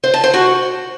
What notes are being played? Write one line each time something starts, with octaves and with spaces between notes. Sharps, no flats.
C5
A5
C5
F#4